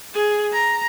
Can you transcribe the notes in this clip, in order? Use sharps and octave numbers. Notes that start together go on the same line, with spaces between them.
G#4
A#5